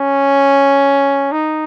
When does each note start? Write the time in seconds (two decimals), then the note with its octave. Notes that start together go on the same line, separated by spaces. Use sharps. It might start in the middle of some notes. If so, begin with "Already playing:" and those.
Already playing: C#4
1.32 D#4